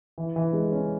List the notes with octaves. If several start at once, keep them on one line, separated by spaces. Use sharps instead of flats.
E3
E3
G#3
C#4